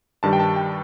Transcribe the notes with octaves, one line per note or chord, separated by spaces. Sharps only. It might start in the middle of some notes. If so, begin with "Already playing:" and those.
G2 D#3 G3 A5
G5
A5
G5